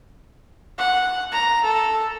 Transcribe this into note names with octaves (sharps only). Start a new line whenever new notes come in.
F#5
A#5
A4